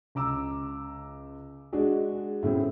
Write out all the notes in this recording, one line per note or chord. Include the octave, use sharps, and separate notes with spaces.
C#2 A#5 D6 E6
G#3 D4 F#4 G#4
A2 C#3 A3 C4